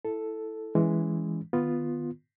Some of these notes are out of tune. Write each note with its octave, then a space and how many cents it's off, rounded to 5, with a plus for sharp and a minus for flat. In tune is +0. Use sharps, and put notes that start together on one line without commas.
E4 +0 A4 +0
E3 +0 G#3 +0 C#4 +15
D#3 -25 B3 +0 F4 +0